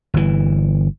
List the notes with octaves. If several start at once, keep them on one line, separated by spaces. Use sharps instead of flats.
G1 E3